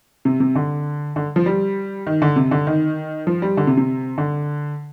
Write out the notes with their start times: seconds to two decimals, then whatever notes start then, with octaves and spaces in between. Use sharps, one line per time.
0.25 C3
0.40 C3
0.55 D3
1.16 D3
1.36 F3
1.46 G3
2.07 D#3
2.22 D3
2.36 C3
2.51 D3
2.67 D#3
3.27 F3
3.42 G3
3.57 D3
3.67 C3
3.77 C3
4.18 D3